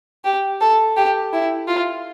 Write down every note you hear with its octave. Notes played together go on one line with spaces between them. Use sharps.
G4
A4
G4
E4
F4